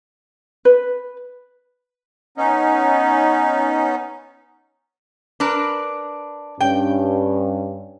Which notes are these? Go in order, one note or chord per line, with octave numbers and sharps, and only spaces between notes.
B4
B3 C#4 D#4
D4 A#4 B4
G2 C#4 G5